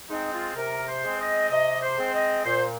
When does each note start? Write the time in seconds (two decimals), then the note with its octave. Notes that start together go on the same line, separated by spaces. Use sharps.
0.09 G#3 C4 D#4
0.33 F4
0.56 C3 A#4
0.88 C5
1.04 G#3 C4
1.19 D#5
1.50 C3 D#5
1.82 C5
1.98 G#3 C4
2.14 D#5
2.44 A#2 C5